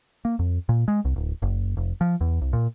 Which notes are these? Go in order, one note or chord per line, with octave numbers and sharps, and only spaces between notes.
A#3
F2
A#2
G#3
C2
D1
F#1
F1
F3
E2
C2
A#2